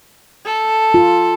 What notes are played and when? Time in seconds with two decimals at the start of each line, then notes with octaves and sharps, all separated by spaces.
0.45 A4
0.94 F4